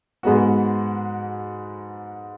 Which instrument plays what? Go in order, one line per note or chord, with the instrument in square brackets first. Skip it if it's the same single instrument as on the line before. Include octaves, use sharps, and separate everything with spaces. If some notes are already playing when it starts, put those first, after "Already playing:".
[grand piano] G#2 G#3 B3 F#4